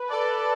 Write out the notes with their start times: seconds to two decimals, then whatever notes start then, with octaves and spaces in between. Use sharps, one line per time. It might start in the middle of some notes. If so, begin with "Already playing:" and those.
Already playing: B4
0.09 A4 D5